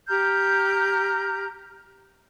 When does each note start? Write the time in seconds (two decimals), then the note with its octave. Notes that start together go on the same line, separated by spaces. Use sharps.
0.08 G4 A#5 F6 G6